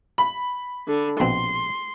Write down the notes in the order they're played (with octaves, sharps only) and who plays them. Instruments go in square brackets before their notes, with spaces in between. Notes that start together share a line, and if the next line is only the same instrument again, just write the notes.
[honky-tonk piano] B5
[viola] D3
[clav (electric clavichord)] A#1 B2 C4 [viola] C6